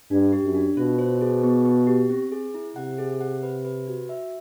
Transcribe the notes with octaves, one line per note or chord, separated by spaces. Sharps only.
G2 D4
G4
F#2
D4
B2 F4
C5
G#4
B3
B3
G4
C4
G#4
E4
C3 F#5
G#4
F#5
B4
B4
F#4
E5